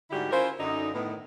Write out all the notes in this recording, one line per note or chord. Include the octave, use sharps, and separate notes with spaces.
G#2 D3 G3 E4 F#4 G4
C#4 E4 F4 A#4 C5
F#2 D3 D#4
A2 D#3 B3